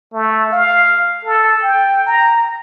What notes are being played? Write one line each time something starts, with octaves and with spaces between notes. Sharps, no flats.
A3
F5
A4
G5
A#5